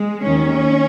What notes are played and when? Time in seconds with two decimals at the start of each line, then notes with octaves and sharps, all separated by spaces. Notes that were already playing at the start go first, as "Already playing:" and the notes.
Already playing: G#3
0.24 D#2 D#3 C#4